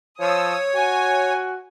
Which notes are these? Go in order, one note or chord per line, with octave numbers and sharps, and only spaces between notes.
F3 C#5 D#6 E6
F#4 G#5